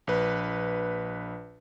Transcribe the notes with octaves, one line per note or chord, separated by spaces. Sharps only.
A#1 B4